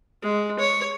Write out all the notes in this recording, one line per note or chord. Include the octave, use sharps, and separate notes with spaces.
G#3
C#5